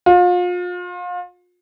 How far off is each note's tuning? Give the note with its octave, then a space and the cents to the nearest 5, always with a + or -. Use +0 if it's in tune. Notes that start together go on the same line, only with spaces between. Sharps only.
F4 +35